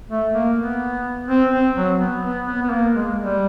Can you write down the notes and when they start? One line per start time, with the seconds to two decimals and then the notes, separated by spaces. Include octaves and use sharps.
0.10 A3
0.33 A#3
0.57 B3
1.28 C4
1.51 C4
1.76 F#3
1.99 B3
2.24 B3
2.46 B3
2.62 B3
2.71 A#3
2.94 G#3
3.18 G3